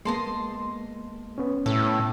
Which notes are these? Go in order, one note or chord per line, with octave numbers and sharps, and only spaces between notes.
G#3 A#3 B3 D#5 A5 C6
B3 C#4
A2 A4